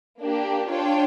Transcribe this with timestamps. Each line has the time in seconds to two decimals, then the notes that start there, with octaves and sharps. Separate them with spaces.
0.20 A#3 D4 G4
0.71 D4 F4 C#5 G5